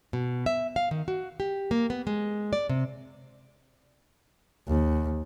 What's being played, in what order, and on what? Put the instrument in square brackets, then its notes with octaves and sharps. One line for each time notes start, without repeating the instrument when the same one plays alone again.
[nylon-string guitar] B2
E5
F5
D#3
F#4
G4
A#3
B3
G#3
D5
C3
[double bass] D#2